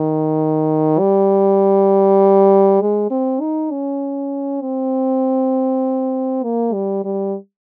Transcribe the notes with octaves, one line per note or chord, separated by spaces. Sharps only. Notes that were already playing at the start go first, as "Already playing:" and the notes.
Already playing: D#3
G3
G#3
C4
D#4
C#4
C4
A#3
G3
G3